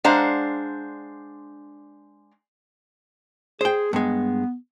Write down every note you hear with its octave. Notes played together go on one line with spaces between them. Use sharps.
G#3 D4 C5 F5 F#5 A#5
G#4 C5 G5
G2 G#3 B3